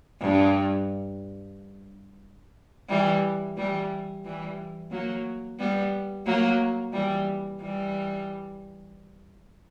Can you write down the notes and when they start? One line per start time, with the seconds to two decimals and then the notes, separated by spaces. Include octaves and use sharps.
0.21 G2
2.89 E3 G3
3.57 E3 G3
4.24 E3 G3
4.91 F#3 A#3
5.59 G3 B3
6.26 F#3 A#3
6.93 E3 G3
7.60 E3 G3